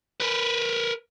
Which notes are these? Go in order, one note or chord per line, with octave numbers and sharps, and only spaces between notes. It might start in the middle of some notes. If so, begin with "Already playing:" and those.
A#4 B4